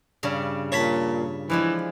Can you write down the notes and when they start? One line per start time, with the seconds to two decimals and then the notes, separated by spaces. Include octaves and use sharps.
0.23 G2 C#3 D4
0.72 A#2 C#5 A5 B5
1.50 E3 F3 G#3 D4